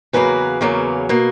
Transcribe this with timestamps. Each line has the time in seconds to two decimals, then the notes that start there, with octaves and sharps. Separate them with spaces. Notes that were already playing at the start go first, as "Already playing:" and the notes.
0.13 E2 C#3 F#3 A#3 B4
0.61 E2 C#3 F#3 A#3
1.09 B2 A#3